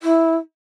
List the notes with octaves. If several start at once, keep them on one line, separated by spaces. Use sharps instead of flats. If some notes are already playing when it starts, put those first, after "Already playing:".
E4